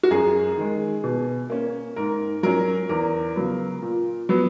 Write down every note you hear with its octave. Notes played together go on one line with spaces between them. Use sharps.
F#4
F#2 G#4
D#3 G#3
B2
A#3 C#4
G#2 A#4
F#3 C#4 A#4
E2 A#4
C#3 F#3 B3
A#2
F#3 B3